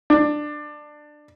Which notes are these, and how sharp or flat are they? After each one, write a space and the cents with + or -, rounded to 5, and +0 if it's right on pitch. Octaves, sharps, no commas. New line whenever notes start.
D4 +15